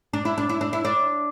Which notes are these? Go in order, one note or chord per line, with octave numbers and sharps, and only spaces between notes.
D4
E4
D4
E4
D4
E4
D4